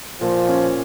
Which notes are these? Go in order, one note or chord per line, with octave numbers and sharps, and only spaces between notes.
A#2 F3
C#4